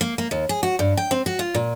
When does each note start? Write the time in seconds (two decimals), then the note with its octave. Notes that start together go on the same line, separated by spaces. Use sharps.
0.01 A#3
0.18 A#3
0.31 D#2
0.49 G#4
0.63 F#4
0.79 G2
0.97 G5
1.11 C4
1.26 F#4
1.39 F4
1.54 A#2